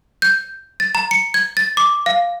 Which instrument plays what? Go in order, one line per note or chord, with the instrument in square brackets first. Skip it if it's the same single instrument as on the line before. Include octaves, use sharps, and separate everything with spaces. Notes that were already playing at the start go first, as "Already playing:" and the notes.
[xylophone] G6
A6
A#5
C#7
G#6
A6
D6
F5